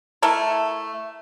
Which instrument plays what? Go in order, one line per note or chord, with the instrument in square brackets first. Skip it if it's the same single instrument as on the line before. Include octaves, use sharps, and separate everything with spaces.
[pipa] A3 E4 A4 A#4